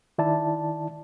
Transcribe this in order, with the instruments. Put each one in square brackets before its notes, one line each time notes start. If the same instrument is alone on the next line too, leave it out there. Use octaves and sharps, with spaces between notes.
[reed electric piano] D#3 E4 D5 A5